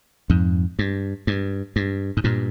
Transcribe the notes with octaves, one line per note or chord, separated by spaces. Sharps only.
F2 G#2
G2
G2
G2
G#2
G2 A#2